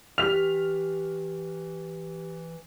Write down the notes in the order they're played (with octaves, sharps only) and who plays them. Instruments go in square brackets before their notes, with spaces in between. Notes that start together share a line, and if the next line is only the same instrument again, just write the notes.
[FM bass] E3 [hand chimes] G4 F#6 [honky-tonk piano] F6 B6 [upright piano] F7